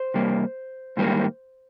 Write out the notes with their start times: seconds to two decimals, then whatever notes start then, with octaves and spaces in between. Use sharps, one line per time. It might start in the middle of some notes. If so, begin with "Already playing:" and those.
Already playing: C5
0.14 C3 G3 A#3
0.97 G#2 D#3 G3 A#3